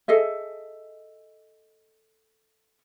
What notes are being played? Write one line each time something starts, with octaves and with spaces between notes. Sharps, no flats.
G#4 A4 D#5 E5